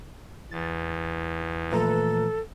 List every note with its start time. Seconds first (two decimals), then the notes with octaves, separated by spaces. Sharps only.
0.51 E2 A6
1.72 A#2 E3 F3 A3 A4 B4 A#5